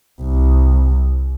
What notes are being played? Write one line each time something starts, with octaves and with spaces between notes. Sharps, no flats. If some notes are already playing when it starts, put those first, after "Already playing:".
C2